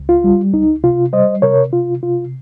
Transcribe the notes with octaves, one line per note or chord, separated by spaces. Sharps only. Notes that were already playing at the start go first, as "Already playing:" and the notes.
Already playing: C#2
F4
G3
C#2 D#4
C3 F4
G3 C5 D#5
C3 A#4 C#5
C3 F4
C3 F4